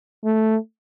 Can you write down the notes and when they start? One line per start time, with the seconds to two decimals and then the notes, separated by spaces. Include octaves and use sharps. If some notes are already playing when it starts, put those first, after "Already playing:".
0.24 A3